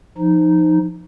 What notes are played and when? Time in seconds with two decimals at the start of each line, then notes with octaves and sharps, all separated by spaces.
0.18 F3 D#4